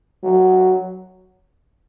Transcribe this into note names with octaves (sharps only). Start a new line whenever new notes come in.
F#3